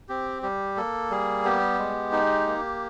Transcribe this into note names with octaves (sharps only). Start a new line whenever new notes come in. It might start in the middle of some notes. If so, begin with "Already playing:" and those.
C4 G4
G3 G4
A#3 A4
G3 G#4
B3 G4
G#3
D#4
A#3